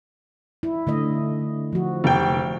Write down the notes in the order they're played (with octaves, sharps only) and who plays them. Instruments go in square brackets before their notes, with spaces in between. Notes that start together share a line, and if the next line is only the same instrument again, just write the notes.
[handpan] E4
D3 A3 D#5
F3 F#4
[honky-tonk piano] F1 G5